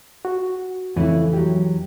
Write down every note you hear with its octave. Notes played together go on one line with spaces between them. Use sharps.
F#4
F2 C#3 E3 A3 E4
F#3 G4